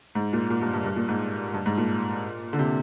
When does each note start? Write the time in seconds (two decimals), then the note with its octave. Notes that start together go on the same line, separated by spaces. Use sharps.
0.15 G#2
0.33 A#2
0.50 A#2
0.62 G2
0.74 G2
0.84 G2
0.96 A#2
1.08 G#2
1.54 G2
1.66 G#2
1.78 A#2
2.53 D3
2.59 C3